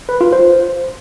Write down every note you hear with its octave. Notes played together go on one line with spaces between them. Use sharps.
B4
F4
C5